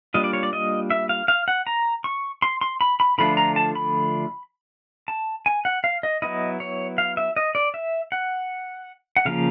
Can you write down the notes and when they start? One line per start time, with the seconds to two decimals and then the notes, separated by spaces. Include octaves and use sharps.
0.14 G3 A#3 D4 F4 D#5
0.24 D5
0.33 C#5
0.43 D5
0.53 D#5
0.90 E5
1.09 F5
1.28 F5
1.48 F#5
1.67 A#5
2.04 C#6
2.42 C6
2.61 C6
2.81 B5
3.00 B5
3.18 D3 F3 A3 D4 F4 B5
3.37 A#5
3.56 A5
3.75 B5
5.08 A5
5.46 G#5
5.65 F#5
5.84 F5
6.03 D#5
6.22 F#3 B3 E4 D#5
6.60 C#5
6.98 F5
7.17 E5
7.36 D#5
7.55 D5
7.74 E5
8.12 F#5
9.17 F#5
9.25 C#3 F3 A#3 F5